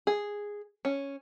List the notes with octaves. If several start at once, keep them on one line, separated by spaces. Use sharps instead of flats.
G#4
C#4